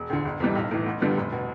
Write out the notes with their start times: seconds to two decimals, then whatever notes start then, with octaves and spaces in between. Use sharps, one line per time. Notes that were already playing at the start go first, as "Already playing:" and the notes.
Already playing: E1
0.10 D2 D3
0.25 G1
0.40 F2 C3 E3 G3
0.56 B1
0.71 A2 E3
0.86 A1
1.01 G2 D3 G3 B3
1.17 F1
1.32 B2